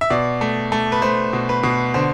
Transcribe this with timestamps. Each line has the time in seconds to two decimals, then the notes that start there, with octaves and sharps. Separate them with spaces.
0.01 E5
0.10 B2 D5
0.41 A3
0.72 A3
0.92 B4
1.02 A3 C5
1.33 B2
1.49 B4
1.63 B2
1.94 D3 C5